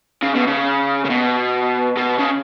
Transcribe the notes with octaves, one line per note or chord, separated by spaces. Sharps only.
C#3
B2
C#3
C#3
B2
B2
C#3